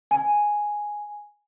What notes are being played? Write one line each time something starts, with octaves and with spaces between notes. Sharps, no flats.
G#5